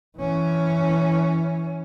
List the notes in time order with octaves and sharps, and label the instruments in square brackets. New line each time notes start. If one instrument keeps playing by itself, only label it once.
[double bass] E3 C#4